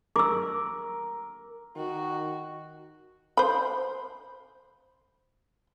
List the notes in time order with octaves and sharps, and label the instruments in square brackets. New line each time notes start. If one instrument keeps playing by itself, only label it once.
[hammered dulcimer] A#4 [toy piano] D6 E6
[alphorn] D#3 [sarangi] F#4
[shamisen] C5 B5